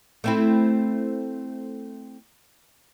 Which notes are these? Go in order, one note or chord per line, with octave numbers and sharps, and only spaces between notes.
A3 C4 E4